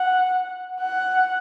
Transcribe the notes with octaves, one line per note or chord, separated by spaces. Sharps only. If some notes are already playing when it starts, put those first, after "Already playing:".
Already playing: F#5
F#5